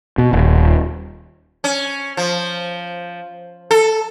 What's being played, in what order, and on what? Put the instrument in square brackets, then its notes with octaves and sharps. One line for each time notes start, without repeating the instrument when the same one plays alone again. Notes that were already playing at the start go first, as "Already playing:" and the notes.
[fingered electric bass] B2
D#1
[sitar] C#4
F3
A4